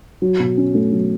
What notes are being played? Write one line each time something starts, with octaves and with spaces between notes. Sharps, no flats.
F#3
B2
C#4
A3
F#3